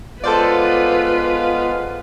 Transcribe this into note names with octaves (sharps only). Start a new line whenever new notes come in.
G#3 B3 F4 A4 B4 C5 D5 F5